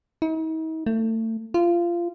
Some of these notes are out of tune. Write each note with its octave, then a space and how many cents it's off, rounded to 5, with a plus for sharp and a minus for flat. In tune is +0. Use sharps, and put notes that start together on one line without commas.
D#4 +45
A3 +30
F4 -20